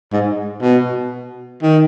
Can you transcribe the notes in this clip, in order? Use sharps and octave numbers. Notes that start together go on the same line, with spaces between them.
G#2
B2
D#3